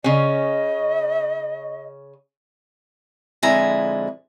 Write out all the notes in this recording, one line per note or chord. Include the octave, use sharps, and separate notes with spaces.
C#3 C#4 D#5
F2 D3 G#3 E4 G#5 A#5